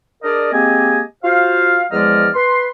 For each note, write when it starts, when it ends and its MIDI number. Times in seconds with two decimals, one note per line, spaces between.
0.23 0.48 62
0.23 0.48 68
0.23 0.48 70
0.23 0.48 74
0.23 0.48 75
0.53 1.00 56
0.53 1.00 58
0.53 1.00 60
0.53 1.00 67
0.53 1.00 75
0.53 1.00 80
1.23 1.84 65
1.23 1.84 66
1.23 1.84 72
1.23 1.84 77
1.92 2.28 40
1.92 2.28 53
1.92 2.28 56
1.92 2.28 74
1.92 2.28 75
1.92 2.28 89
2.35 2.67 71
2.35 2.67 84